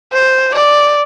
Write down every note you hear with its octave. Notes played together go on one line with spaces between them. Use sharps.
C5
D5